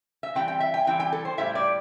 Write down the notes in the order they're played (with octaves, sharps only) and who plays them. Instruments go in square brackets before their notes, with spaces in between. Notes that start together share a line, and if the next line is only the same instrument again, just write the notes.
[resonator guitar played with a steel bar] E5
E3 G3 C4 E4 G5
G5
E5
G5
E3 G3 C4 E4 G5
G5
A4
C5
A2 G3 E4 E5
D5